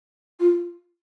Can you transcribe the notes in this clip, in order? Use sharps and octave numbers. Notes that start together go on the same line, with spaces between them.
F4